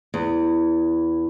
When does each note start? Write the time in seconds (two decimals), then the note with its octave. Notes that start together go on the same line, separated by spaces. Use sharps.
0.14 E2